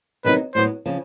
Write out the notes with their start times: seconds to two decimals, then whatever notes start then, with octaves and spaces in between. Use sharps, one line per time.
0.24 C3 D#3 F#3 B3 D#4 B4
0.55 A2 F#3 B3 C5
0.86 C#3 F3